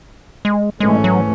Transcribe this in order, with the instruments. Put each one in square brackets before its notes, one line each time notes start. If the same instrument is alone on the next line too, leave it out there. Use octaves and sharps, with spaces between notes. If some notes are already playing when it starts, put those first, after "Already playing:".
[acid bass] G#3
[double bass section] G#2 E3 A3 C#4 [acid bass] G#3
[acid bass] F#3